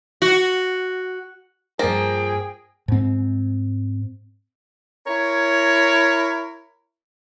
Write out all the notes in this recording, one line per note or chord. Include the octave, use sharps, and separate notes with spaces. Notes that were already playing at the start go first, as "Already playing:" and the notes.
F#4
G2 F3 A#3 G#4 G5 A#6
G#2 C4
E4 A#4 C#5